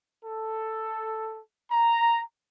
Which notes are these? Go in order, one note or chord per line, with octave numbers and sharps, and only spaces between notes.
A4
A#5